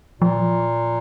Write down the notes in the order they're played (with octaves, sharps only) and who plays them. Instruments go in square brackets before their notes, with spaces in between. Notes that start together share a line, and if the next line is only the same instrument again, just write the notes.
[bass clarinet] A#2 [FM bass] F3